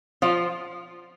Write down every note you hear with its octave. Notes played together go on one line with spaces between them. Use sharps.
F3 F4